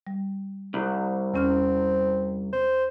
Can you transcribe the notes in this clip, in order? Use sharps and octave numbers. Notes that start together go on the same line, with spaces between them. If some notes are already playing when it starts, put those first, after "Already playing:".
G3
C2
E2 C4 C#4 F6
C5